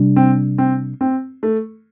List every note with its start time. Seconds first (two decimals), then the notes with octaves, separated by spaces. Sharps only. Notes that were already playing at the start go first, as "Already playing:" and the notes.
Already playing: C3 G3 D4
0.16 C4
0.58 C4
1.01 C4
1.43 A3